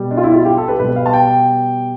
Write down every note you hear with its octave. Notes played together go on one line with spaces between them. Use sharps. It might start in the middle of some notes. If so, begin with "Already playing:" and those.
Already playing: B2 G3
D4
F4
E4
F4
G4
A4
B4
B2 G3 B4
F5
A5
G5